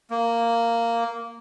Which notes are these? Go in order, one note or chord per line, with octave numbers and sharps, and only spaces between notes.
A#3